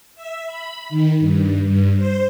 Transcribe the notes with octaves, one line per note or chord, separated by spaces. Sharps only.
E5
B5
D#3
G2
G2
C5